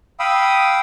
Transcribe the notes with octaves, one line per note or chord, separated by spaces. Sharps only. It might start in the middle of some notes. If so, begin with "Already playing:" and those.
F5 G5 B5 D#6 E6